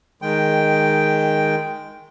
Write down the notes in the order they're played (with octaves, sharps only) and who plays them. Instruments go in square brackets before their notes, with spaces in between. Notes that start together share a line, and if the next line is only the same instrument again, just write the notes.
[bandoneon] D#3 G#3 G5